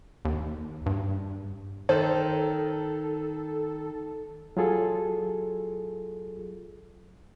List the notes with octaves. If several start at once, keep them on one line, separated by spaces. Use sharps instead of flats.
D#2
G2
D#3 A4 C5
F#3 F4 G#4 A4